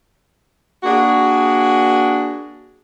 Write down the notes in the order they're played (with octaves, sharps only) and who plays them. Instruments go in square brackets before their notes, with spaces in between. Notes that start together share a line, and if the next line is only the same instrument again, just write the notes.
[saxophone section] A#3 D4 F#4 G#4